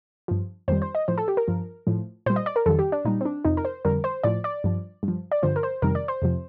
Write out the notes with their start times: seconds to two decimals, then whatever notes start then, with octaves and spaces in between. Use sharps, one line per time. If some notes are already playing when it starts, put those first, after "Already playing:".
0.28 G2 F3
0.68 F2 D#3 G3 C5
0.82 C5
0.95 D#5
1.08 A2 F3 C5
1.18 A4
1.28 G4
1.37 A#4
1.48 G2 F3
1.87 A2 F3
2.26 A#2 G3 C5
2.36 D#5
2.46 D5
2.56 A#4
2.66 F2 D#3 G3 A4
2.79 G4
2.92 D4
3.05 A#2 G3 D#4
3.21 C4
3.25 D4
3.45 F2 C3 F3 D#4
3.57 A#4
3.65 C5
3.85 F2 D3 G3 A#4
4.04 C5
4.23 A2 F3 D5
4.44 D5
4.64 G2 F3
5.03 G2
5.08 F3
5.32 D5
5.43 G2 D3 F3 C5
5.56 A#4
5.63 C5
5.82 F2 C3 D#3 G3 A#4
5.95 D5
6.08 C5
6.22 F2 C3 F3